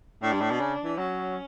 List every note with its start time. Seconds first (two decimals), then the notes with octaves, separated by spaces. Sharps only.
0.22 A2 D4
0.32 G2
0.41 A2
0.51 B2
0.60 C#3
0.84 E3
0.97 F#3 C#4